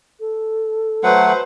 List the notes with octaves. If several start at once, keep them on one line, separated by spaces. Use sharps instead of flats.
A4
F#3 A3 B4 C5 F#5